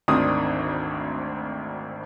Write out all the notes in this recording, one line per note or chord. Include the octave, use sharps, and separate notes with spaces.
G#1 D2 D#3 C4 D4 D#6